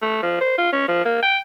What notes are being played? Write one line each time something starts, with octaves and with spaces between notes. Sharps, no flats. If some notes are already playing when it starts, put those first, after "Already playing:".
A3
F3
C5
F4
C#4
F3
A#3
G5